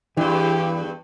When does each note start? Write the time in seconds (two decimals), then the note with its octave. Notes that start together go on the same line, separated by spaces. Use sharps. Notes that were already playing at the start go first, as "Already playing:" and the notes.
0.17 E2 G2 E3 G4